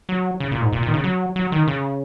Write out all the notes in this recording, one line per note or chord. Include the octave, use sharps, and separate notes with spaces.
F#3
C#3
A#2
G#2
A#2
A#2
D#3
C#3
F#3
F#3
D#3
C#3